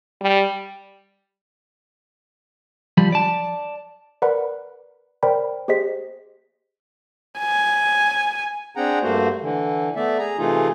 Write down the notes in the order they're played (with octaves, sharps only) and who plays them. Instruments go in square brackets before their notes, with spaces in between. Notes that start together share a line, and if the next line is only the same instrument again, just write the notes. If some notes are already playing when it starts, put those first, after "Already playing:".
[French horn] G3
[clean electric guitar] F3 G3 B5
D5 A5
[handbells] A#4 B4 D5 F#5 B5
A#4 C5 D5 G5 B5
G4 G#4 C5 D#5 B6
[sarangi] G#5
[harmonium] C4 D4 G#4 F#5 G5 A#5
G2 A3 A#3 F#4 C5
D3 E3
A3 B3 D5 E5
G#4 A#5
C3 E3 A3 D#4 F4 G#4